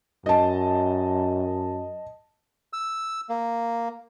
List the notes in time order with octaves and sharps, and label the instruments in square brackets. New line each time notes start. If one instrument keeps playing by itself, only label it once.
[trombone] F#2 [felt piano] D#5 A5
[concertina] E6
A#3